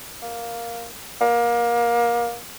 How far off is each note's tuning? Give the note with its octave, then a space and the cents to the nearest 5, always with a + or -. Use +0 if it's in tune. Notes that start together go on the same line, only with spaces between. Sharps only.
A#3 +5
A#3 +25